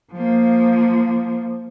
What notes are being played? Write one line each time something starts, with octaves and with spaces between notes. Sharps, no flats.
F3 A#3